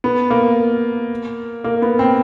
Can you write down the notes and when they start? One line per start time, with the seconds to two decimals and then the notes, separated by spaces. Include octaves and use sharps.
0.04 B3
0.30 A#3
1.64 A#3
1.82 B3
1.99 C4